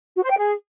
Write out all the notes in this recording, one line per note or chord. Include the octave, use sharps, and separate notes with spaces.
F#4
C5
G5
G#4